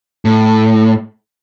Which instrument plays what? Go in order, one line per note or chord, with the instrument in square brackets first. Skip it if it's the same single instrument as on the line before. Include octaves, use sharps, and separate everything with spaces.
[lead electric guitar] A2